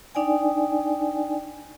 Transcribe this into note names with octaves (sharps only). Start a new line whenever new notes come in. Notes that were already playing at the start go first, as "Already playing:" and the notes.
D4 D#4 D5 G5 G#5